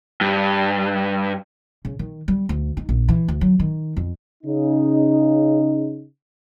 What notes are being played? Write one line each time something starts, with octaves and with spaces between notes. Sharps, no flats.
G2
C#3
D#3
G3
D2
D#4
A#1
E3
D2
F#3
D#3
F2
C#3 D#4